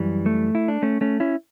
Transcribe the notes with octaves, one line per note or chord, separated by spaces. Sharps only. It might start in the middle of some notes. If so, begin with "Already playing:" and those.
Already playing: F#2 E3 G3
A3
E4
D4
A3 C#4
A3 C#4
C#4 E4